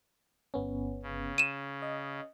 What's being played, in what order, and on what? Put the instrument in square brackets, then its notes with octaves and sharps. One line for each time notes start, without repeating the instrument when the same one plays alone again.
[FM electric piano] G1 B3 C#4
[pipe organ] C#3
[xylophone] D#7 E7
[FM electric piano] D#5